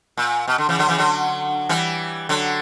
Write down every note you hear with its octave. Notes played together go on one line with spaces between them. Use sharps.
A#2
B2
D3
C#3 E3
D3 F#3
C#3 E3
D3 F#3
E3 G3
D3 F#3